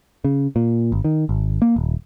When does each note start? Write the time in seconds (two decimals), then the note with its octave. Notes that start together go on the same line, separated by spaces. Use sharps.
0.25 C#3
0.56 A#2
0.92 G#1
1.04 D#3
1.29 G#1
1.62 A#3
1.76 D#1